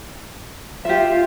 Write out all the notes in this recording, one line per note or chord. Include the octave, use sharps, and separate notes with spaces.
F4 G4 E5